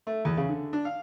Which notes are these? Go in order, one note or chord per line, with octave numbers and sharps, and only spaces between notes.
A3
E2
C#3
D3
D4
F5